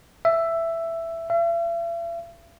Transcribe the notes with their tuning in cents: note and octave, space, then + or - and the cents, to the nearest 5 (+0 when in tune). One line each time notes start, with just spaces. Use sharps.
E5 +10
E5 +45